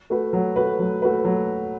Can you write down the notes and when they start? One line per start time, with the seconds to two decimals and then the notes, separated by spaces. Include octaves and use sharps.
0.10 A3 F#4 B4
0.33 F#3
0.56 A3 F#4 B4
0.79 F#3
1.02 A3 F#4 B4
1.25 F#3